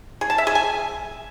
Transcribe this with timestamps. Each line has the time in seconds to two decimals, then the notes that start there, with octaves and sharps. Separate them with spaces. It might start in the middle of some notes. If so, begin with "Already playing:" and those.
0.21 G#4
0.30 A5
0.38 E5
0.47 G#4
0.55 G#5